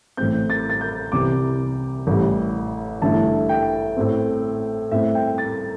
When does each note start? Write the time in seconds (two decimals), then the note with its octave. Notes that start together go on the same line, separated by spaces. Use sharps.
0.17 A1 A2 A3 C4 G6
0.50 A6
0.70 A6
0.81 G6
1.12 C2 C3 E3 G3 D6
2.07 A1 A2 G3
3.02 A1 G2 D3 A3 E4 A5
3.49 G5
3.97 A2 A3 C4
4.91 A2 A3 C4 E5
5.15 G5
5.38 A6